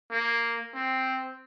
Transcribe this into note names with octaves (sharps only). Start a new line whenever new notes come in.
A#3
C4